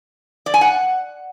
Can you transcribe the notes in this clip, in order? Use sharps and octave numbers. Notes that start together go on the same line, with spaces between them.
D5
G#5
F#5